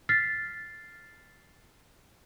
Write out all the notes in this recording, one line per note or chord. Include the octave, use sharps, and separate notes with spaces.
F6 A6 B6 C7